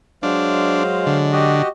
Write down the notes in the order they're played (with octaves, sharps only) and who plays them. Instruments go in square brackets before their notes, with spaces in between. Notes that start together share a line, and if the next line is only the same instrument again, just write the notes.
[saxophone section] F#3 G#3 [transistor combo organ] D4 [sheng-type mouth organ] C5 F5
[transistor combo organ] D3
[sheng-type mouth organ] F#4 G4 D#5